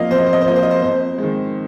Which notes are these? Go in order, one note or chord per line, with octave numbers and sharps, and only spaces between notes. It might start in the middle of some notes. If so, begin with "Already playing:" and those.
Already playing: F2 F3 A#3 D#5 F5
F2 C5
D#5
C5
D#5
C5
F3 A#3 D#5
C5
D#5
C5
F2 C5
D#3 G#3